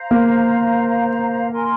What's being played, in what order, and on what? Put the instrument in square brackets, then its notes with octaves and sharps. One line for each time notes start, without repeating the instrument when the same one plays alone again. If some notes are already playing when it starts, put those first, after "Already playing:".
Already playing: [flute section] C5 F5 A#5
[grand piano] A#3
[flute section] A#4 G#5 C6